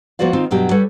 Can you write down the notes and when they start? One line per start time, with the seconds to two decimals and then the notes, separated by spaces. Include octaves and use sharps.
0.19 F3 A#3 B3 F#4 D5 F5
0.33 D#3 C4 F4
0.51 G2 B2 F#3 G4
0.71 G3 A4 B4 C#5